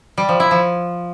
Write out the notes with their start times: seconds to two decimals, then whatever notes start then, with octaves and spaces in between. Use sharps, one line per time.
0.17 G3
0.29 F3
0.40 E4
0.51 F3